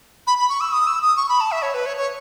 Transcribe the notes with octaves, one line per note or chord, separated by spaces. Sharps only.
B5
B5
C#6
E6
D#6
E6
D#6
C#6
B5
A5
E5
C#5
B4
C#5
C#5